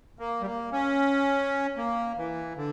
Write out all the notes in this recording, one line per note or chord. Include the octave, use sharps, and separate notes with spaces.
A#3
G3
A#3
C#4
A#3
E3
D3